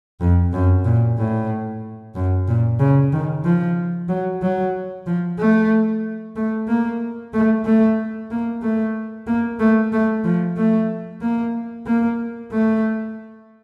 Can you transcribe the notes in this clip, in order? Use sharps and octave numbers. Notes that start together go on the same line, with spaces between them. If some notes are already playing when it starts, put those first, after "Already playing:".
F2
F#2
A#2
A2
F#2
A#2
C#3
D#3
F3
F#3
F#3
F3
A3
A3
A#3
A3
A3
A#3
A3
A#3
A3
A3
F3
A3
A#3
A#3
A3